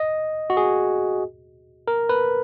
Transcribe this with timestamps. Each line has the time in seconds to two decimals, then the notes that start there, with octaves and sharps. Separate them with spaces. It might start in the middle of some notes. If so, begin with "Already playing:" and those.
Already playing: D#5
0.50 F#4
0.57 G#4
1.88 A#4
2.09 B4